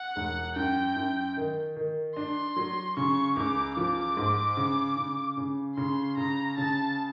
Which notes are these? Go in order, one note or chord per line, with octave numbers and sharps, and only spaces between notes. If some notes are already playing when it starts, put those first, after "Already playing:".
Already playing: F#5
E1
F#2 G5
F#2
D#3
D#3
D4 C6
F#3
C#3 C#6
C#2 D6
F3 D6
G#2
C#3
C#3
C#3
C#3 C6
C#3 A#5
C#3 A5